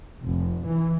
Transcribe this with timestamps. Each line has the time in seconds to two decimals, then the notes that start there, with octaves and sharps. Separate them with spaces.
0.24 F1
0.66 E3